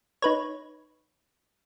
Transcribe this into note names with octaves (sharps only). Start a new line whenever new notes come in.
D#4 B4 C#5